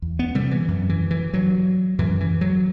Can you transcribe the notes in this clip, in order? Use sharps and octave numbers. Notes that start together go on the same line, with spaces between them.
E2
B3
C3 G3
E3
F#2
E3
E3
G2 F#3
F#2 E3
E3
F#3